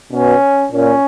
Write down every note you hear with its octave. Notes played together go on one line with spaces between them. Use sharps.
B2 C#4
A#2 C#4